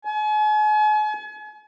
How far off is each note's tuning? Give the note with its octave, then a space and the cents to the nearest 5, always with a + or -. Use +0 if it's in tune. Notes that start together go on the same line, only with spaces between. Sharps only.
G#5 +40